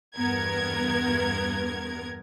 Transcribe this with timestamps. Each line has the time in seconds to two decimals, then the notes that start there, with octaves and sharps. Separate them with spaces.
0.17 E2 G2 B3 A#4 G#6